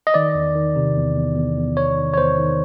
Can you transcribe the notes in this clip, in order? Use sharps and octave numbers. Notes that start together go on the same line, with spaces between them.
D#5
D#3 D5
E2
D#3
C3
E2
E2
E2
E2
E2 C#5
D#3
C#5
E2 C5
D#3